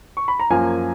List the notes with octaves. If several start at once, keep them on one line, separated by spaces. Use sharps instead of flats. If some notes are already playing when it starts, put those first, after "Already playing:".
C#6
B5
A#5
F#2 F3 A#3 G#5